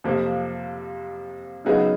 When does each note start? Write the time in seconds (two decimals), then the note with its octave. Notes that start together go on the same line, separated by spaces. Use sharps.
0.04 F2 C3 F3 A#3
1.65 C#3 F#3 B3 D#4 G#4